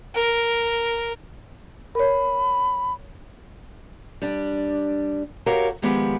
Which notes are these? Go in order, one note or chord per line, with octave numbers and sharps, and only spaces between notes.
A#4
A#4 C#5 B5
G3 D4
F#4 G4 A#4 C#5 F5
D#3 F3 G#3 B3 G4